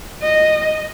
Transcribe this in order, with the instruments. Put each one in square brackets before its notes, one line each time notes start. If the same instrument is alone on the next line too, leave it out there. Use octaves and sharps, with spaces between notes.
[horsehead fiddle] D#5